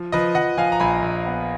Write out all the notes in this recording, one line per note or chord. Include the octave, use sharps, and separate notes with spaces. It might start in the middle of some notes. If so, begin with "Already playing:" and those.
Already playing: F3
F3 B4 D#5
F3 D#5 F#5
F3 F5 G#5
A#5
A#1 G#5 B5
A#1
B3